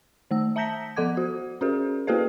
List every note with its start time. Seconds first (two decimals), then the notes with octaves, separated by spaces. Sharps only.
0.31 D#3 A3 E6
0.56 E5 A5 A#5 G6 A#6 B6
0.96 F3 A4 F#5 D6 G#6
1.17 F#4
1.61 C#4 F#4 G#4 A#4
2.07 A#3 F#4 G#4 A4 B4 D#5